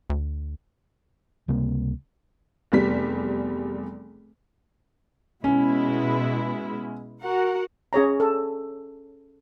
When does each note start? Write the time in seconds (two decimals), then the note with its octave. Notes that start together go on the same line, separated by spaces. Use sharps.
0.10 D2
1.48 C#2 C3 G3 A#3
2.72 F1 E2 G3 B6
5.44 B2 G#3 C#4 E4
7.23 F#4 A#4 F#5
7.93 C#4 G#4 C#5 A#5
8.20 A4